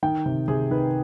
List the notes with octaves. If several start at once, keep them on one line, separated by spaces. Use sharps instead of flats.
D#3 G5
C3
C3 G#4
D#3 B4